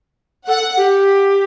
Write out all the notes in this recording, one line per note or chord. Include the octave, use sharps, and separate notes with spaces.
A4 F#5
G4